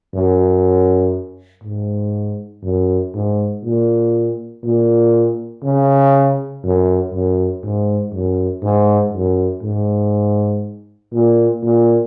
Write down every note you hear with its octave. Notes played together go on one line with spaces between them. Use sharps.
F#2
G#2
F#2
G#2
A#2
A#2
C#3
F#2
F#2
G#2
F#2
G#2
F#2
G#2
A#2
A#2